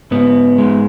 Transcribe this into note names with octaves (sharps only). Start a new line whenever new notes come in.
G#2 B3
G#3